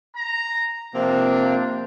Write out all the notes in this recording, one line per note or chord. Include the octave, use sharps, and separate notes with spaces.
A#5
C3 F3 A#3 C4 D4